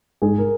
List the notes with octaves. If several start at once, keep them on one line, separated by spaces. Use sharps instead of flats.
G#2 G#4
A#4